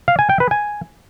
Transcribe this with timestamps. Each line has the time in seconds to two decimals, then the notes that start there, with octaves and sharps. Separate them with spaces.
0.08 F5
0.19 G#5
0.30 G5
0.40 B4
0.51 G#5